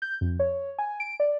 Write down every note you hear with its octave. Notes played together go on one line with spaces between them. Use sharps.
G6
F2
C#5
G#5
D7
D5